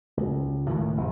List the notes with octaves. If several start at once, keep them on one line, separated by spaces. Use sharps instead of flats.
C#2
C#2 A2 D#3
E1 C3 G#3